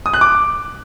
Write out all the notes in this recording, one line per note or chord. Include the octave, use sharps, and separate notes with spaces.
D#6
F#6
D6